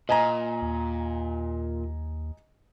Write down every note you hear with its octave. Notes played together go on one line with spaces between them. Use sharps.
A#2 D#5 G#5 A#5
D#2